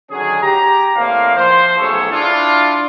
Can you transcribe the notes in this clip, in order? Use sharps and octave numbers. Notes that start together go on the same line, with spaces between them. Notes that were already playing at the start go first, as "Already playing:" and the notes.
D3 D#3 F#3 C#4 G#4
G4 A#5
A2 E3 A#3 C4 D5 F5
F3 C5
B1 F#3 A3 G#4 A4 C#5
D4 E4 F4